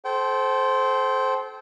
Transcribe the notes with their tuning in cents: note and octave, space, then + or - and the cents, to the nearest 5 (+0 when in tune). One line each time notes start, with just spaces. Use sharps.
A4 -35 C5 +0 G5 -30